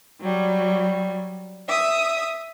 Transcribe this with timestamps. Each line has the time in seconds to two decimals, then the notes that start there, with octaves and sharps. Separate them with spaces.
0.21 F#3 G3
1.69 E5 D#6